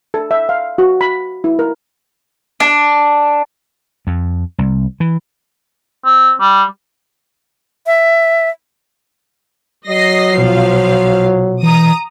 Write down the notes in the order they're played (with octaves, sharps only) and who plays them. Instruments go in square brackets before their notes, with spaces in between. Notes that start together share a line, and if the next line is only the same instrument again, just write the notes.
[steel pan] A4
E5
F5
F#4
B5
E4
A#4
[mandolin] D4
[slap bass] F2
C2
E3
[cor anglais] C4
G3
[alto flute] E5
[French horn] F#3 [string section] D#5 A#6 C7
[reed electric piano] B2 [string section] F3 F5
[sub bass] E3 [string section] A#5 D#6